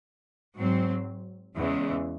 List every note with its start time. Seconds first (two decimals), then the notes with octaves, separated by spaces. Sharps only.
0.57 G#2 F#3 C4
1.56 E2 C#3 E3 G#3